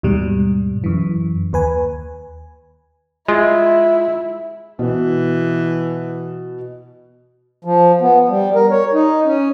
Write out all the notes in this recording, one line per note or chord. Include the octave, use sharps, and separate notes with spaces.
D#2 G#2 B2 G3
F#2 E3
D#2 B4 G#5
G#3 E4 F4
B2 E3
F3
B3
G3
A#4
C#5
D#4
C#4